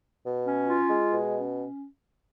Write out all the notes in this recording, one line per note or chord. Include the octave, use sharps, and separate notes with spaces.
B2
C#4
F4
G#3
B2
C#4